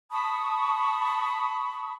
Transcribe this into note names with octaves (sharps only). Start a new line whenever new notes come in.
A5 B5 C#6 D#6